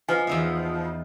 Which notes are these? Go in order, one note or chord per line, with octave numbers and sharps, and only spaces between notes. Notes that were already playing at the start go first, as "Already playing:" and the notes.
F3 B4 D#5 G#5
E2 D#4 E5